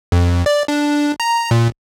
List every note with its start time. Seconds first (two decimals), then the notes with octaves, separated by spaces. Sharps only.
0.12 F2
0.46 D5
0.68 D4
1.20 A#5
1.51 A#2